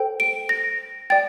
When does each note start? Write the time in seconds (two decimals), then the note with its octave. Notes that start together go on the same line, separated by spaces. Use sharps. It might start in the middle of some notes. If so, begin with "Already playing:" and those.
Already playing: A4 C5 G5
0.20 D7
0.49 A#6
1.10 D5 G5 A6